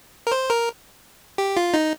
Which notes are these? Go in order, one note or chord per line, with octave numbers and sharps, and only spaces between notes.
A#4
C5
A#4
G4
F4
D#4